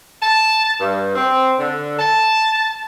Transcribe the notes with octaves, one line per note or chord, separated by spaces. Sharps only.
A5
G2
C4
D3
A5